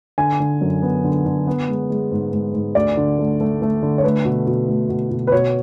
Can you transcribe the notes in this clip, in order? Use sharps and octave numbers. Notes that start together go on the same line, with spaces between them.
D3 G#5
D3
F#2
B3
D3
D3
B3
G#3
G#3
G#2
G#2
G#2
D2 D5
D3
A3
A3
A3
D3
C#5
A3 B4
B2
B2
A3
B2
B2
B4
B2 C#5